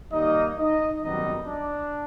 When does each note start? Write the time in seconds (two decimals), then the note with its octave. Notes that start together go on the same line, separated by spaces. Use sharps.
0.12 D#2 D#3 G3 A#3 D#4 D#5
0.58 D#4 D#5
1.02 G#1 F#2 D#3 G3 B3 D#4 D#5
1.47 D4 D5